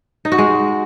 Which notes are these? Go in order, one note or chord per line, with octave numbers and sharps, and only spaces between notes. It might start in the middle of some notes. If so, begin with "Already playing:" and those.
D#4
F#4
G#3